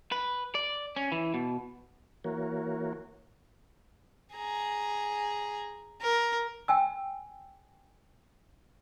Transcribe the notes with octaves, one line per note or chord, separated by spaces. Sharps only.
B4
D5
C#4
E3
B2
E3 A#3 F#4 A#4 C#5
G#4 A#5
A#4
G5 G#5 E6